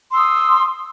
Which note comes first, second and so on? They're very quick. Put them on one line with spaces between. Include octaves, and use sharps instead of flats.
C6 E6 D#6